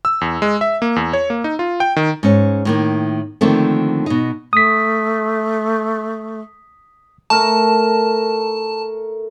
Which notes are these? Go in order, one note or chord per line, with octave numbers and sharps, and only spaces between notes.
E6
E2
G#3
E5
A#3
E2
C#5
A#3
D#4
F4
G5
D#3
G#2 C#4
A2 D#3 A#3
D3 D#3 F3 A3 A#3 C4
B2 D#4
A3 D#6 B6
A3 A#4 A5 A#5